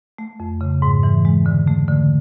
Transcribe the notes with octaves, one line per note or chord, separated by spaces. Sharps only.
A3
F2
C#3
G#2
E3
G#3
D3
A3
D3